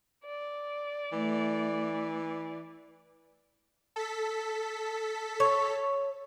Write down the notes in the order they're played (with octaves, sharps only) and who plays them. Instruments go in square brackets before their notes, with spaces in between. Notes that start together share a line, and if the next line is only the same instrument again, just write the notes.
[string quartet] D5
[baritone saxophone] E3 [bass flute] A3
[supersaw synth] A4 B6
[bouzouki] C#5